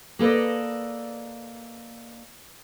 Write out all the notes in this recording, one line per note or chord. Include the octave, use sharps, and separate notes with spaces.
A#3 A4 B4 D5 D#5